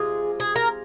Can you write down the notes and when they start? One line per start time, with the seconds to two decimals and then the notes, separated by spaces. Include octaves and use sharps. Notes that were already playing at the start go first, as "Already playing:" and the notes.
Already playing: C3 G#3 F4 G#4
0.40 G#4
0.56 A#4